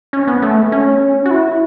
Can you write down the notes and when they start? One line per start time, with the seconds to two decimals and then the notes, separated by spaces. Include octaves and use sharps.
0.13 C#4
0.27 B3
0.42 A3
0.72 C#4
1.26 F#4
1.31 E4